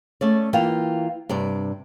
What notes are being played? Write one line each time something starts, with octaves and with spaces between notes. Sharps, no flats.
A3 C#4 D5
E3 A#3 F4 G5
G2 C3 D5